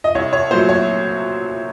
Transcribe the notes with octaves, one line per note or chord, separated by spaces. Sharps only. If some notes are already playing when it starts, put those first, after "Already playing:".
D#5
C2 C#5
C#5
A#2 F#3 A3 C5
C#5